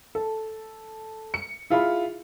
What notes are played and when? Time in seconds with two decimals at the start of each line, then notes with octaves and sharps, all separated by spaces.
0.15 A4
1.34 C#7
1.70 E4 F4 G#4 B5